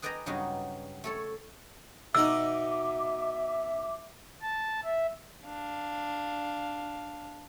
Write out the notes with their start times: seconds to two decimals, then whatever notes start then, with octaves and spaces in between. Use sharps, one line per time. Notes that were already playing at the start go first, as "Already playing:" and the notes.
0.02 G#4 B4 D5 D#5 G5 A#5
0.26 G2 C#3 F#3 G3 D#4 F#4
1.04 A3 A4 C#5
2.15 B2 D#4 E5 F#5 D6 E6
4.42 A5
4.84 E5
5.45 D4 F5